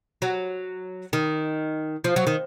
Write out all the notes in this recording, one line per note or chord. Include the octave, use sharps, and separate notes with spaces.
F#3
D#3
F3
F#3
D#3